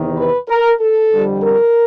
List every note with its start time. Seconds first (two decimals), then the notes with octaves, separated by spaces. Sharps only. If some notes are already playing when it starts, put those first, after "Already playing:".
Already playing: E2 C3 D#3
0.16 B4
0.48 A#4
0.79 A4
1.11 F2 D3 G3
1.43 A#4